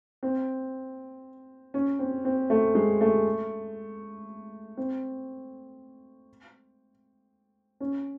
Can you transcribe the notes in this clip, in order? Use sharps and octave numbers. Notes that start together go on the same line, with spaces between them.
C4
C#4
C4
C4
A3
G#3
A3
C4
C#4